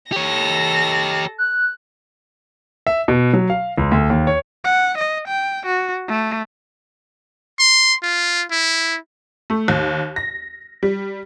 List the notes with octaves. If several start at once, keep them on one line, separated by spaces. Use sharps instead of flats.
G4 A4 C#5 A#6
F#6
E5
B2
F#3
F5
C#2
D2
D#2
C#5
F#5
D#5
G5
F#4
A3
C6
F4
E4
A3
D#2
A#6
G3